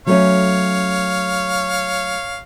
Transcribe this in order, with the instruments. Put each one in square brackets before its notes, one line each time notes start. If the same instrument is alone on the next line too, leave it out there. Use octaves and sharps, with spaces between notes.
[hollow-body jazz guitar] F#3 A3 C#4 [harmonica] C#5 F5